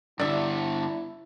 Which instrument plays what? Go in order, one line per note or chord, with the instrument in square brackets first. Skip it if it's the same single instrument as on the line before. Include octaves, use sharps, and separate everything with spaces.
[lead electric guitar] G2 D3 [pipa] D4 E5 [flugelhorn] E4